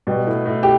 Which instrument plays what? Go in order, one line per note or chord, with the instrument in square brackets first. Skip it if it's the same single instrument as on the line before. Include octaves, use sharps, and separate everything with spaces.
[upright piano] B2 [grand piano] G3 B3 G4
[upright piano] A2
A2
[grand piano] G4